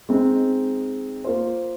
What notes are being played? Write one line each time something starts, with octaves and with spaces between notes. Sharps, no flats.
G#3 C4 D#4
A#3 F4 C5